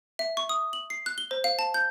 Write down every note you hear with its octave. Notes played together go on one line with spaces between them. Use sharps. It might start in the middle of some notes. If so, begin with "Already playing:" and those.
E5
C#6
D#6
F#7
C7
F#6
G7
C5
F5
A5
G6